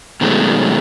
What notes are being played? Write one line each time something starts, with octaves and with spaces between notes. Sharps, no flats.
B2 D#3 F#3 G#3 A3